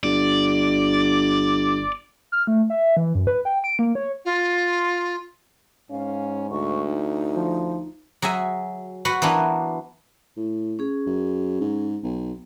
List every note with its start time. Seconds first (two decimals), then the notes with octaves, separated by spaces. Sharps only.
0.04 G1 D5
2.32 F6
2.47 A3
2.70 E5
2.97 E3
3.15 F#2
3.27 B4
3.45 G5
3.64 D7
3.79 A#3
3.95 C#5
4.25 F4
5.91 G#2 C#4 F5
6.51 D2 C#6
6.88 D#4
7.36 F3
8.22 F#3 G#4 E5 G#5
9.05 F#4 B4 F#5
9.22 E3 A#3 B3 D4
10.37 A2
10.79 C#4 G#4
11.07 F#2
11.61 G#2
12.03 B1